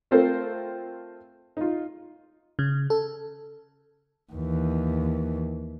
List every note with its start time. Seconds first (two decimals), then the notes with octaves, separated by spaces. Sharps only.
0.11 A3 C4 F4 A4 A#4 C5
1.57 D#4 F4
2.59 C#3
2.90 A4
4.33 D#2 E3